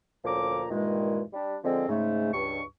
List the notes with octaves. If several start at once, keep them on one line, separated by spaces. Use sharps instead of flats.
D2 A#2 F3 C#4 A#5 D6
G2 A#2 D#3 E3 G#3
G3 D4
D3 F3 G#3 C4
G#2 C#3 A3
C#2 G2 C#6